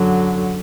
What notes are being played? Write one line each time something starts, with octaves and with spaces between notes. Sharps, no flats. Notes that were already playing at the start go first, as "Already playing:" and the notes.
Already playing: F#2 D3 F#3